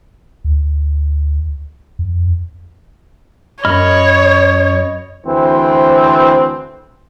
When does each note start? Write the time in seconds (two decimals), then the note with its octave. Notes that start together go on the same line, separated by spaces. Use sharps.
0.45 D2
1.99 F2
3.65 F#2 C#5 D#5 B5 F6
5.26 D2 E3 C4 C5